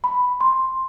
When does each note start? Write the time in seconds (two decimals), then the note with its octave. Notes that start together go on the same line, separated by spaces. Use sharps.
0.04 B5
0.41 C6